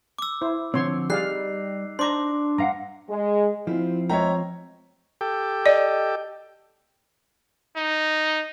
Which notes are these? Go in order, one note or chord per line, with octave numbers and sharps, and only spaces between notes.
D6 E6
E4 C5
D3 F3 C4 C#5 C6
G3 D#4 G#4 D5 F5 F#6 C7
D4 C5 A#5 C6 D6
G2 F5 F#5 A#5
G#3
F3 C4 E4 F4
G#3 C#5 E5 G5 A#5
G4 A4 G5
D5 D#5
D#4